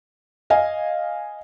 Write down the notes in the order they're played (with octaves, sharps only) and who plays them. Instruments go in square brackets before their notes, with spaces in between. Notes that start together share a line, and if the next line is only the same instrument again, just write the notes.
[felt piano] D#5 F5 G#5